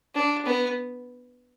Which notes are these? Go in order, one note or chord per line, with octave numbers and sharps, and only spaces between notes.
D4
B3